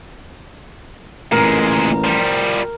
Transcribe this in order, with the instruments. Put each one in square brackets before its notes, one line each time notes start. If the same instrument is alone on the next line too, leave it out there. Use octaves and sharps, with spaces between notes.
[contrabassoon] A1 [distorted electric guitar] A#2 G#3 [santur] A#4
[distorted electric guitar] F3 G3